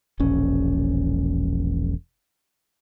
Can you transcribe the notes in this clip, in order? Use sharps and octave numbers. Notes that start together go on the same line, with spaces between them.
E1 A#1 C#4